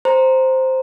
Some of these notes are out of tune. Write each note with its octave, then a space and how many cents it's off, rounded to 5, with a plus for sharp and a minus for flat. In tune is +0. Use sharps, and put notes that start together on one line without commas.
C5 +0 A#5 +0